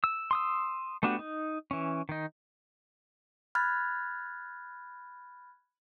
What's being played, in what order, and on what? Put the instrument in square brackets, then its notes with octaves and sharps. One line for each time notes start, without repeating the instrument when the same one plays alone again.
[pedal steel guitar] E6
C6 D#6 E6
A3 B3 D4 F#4 G4
D#4
E3 C#4
D#3 D#4
[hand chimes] B5 F6 F#6 G#6 A6